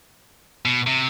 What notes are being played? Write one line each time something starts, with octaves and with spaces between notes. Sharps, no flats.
B2
C3